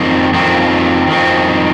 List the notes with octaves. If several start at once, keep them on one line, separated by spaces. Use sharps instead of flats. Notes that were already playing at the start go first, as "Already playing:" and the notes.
Already playing: F2 D#3 C4
F2 D#3 C4
F2 D#3 C4